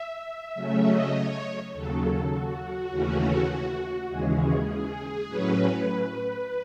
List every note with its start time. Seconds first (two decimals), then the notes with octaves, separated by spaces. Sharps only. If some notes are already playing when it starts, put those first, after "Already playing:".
Already playing: E5
0.55 C#3 F#3 A3 C#4 E5
0.85 D#5
1.14 C#5
1.74 D#2 C#3 F#3 A4
2.03 A4
2.33 F#4
2.62 F#4
2.91 D#2 C#3 E3 A3 C#4
4.09 D#2 C#3 E3 G#3 C#4 G#4
5.28 A2 F#3 C#4 B4